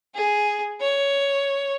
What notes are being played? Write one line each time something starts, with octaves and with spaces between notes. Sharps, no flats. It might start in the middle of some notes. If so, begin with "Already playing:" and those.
G#4
C#5